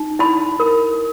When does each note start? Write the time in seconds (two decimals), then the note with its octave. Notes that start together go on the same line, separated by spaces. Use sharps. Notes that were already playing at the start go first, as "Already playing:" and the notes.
Already playing: D#4
0.19 E4 B5
0.60 A#4